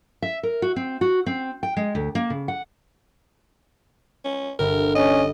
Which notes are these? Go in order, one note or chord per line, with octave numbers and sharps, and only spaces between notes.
E5
A#4
F#4
C4
F#4
C4
G5
G#3
D2
A#3
C#3
F#5
C#4
G1 A#4
C#4 D#5